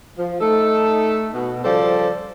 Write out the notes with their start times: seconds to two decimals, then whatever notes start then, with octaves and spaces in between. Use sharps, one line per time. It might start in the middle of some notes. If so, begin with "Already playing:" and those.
0.17 F3
0.41 A3 D#4 A4
1.33 B2
1.64 C#3 F3 G3 A4 C5 D5